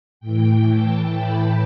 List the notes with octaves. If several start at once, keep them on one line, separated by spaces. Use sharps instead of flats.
A2 E3 G5
A5
B5